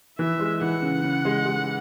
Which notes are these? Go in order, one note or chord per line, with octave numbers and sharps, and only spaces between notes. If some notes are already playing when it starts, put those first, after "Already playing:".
E3 E5
G#3
E3 F#5
C#3
C#3
G#3
G#3